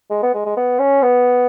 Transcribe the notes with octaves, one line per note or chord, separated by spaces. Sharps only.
G#3
B3
G#3
G#3
B3
C#4
B3